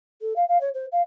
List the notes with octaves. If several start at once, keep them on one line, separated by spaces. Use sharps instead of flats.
A4
F5
F5
C#5
C5
F5